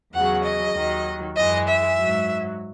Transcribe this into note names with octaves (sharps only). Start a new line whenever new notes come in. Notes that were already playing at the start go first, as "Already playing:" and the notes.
E2 C#3 F#3 F#5
D#5
D#2 D#3 F#3
F#2 E3 G#3 D#5
E5
G#2 F#3